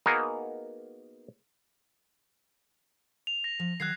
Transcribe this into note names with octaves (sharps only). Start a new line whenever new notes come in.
A#3 B3 D#4 F#4 G#4 A#4
F7
A#6
F3
D#3 F#3 F#5 F#6 G#6 C7